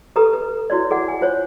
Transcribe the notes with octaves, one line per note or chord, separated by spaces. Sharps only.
G4 A4 B4 A#5 D#6
B4
E4 F#4 C#5 D5
G#4 D5 F#5
G#5
F4 C5 C#5